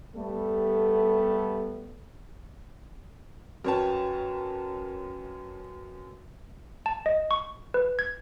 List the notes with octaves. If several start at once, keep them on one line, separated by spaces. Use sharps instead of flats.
G3 A3 B3 G4 A4
F#2 F#4 A#4 B4 C#5 G5 A5
A5
D#5
C#6
B4
G#6